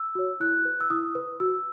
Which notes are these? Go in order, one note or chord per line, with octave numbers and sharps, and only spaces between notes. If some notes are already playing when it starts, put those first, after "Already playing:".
Already playing: E6
F#4 C#5
E4 F#6
B4
E6
E4 D#6
B4
F#4 E6